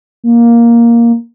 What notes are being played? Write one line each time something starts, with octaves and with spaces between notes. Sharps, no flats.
A#3